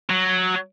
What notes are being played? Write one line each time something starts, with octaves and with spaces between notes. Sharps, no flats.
F#3